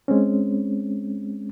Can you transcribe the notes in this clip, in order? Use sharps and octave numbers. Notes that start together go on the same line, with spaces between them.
G#3 C4 C#4